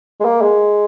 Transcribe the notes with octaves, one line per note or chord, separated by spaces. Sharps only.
G#3
A#3
G#3